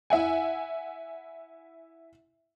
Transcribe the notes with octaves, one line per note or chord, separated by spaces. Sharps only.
E4 E5 F#5 G#5